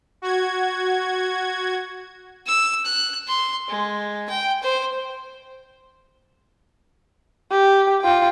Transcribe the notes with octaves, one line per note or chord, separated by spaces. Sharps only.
F#4 G#6
E6
F#6
C6
G#3
G5
C5
G4
F4 G5